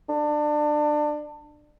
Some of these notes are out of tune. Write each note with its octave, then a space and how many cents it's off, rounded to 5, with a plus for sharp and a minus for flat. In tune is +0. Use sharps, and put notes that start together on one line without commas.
D4 +25